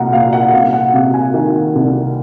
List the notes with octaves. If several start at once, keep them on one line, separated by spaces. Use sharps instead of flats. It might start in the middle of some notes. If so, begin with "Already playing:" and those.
Already playing: C2 A#2 F#5 A#5
A#2 F5
F#5
F#5
C2 F5
F#5
C3 F5
G#5
D#3
C2